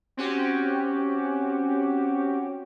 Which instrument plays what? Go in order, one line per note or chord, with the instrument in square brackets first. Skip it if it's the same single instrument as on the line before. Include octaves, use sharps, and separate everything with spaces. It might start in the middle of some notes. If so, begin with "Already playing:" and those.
[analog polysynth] C4 C#4 F#4 G4